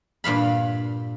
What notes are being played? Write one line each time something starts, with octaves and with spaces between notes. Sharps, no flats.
G2 A#2 F5 B5